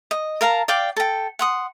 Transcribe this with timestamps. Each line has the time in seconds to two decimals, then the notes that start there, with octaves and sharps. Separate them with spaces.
0.11 D#5
0.41 A#4 F5 A5 A#5
0.68 D5 F5 G5 D6
0.97 A4 G5
1.39 F#5 C6 D#6